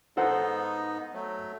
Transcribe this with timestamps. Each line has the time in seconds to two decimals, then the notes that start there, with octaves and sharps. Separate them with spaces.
0.17 G#2 B3 D#4 A4 C5 F#5
1.14 F#3 A3